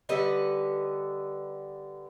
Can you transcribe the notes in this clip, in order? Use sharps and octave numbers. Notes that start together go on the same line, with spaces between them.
D3 G3 B4 D#5